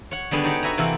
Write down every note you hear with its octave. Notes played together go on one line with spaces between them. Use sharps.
C#5 F#5
D3 G3 B3 G#4 A5
D#4 F#4 G4 C#5 D5
F#4 B4 E5 G#5 A#5
C3 E3 A#3 C4 F#4 A4